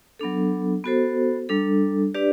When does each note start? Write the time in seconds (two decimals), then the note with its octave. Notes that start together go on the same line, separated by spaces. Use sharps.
0.19 F#3 B3 D4 A4
0.84 B3 F#4 A4 C5
1.49 G3 D4 A4
2.14 D4 G4 B4 D5